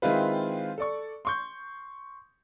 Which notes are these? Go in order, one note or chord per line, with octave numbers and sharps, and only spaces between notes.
D#3 G#3 C4 E4 F4 B4
A4 D5 C#6
C6 C#6 G6